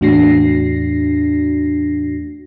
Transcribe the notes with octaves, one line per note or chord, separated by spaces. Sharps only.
E2 A2 D4 F#4 A#6 C7